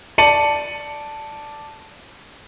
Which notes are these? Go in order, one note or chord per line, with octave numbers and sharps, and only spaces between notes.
D5 A5 C#7 D#7 F#7